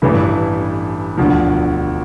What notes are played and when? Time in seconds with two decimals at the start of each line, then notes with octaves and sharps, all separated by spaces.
0.02 A1 G2 E3 A3 E4
1.17 E1 D2 D3 F3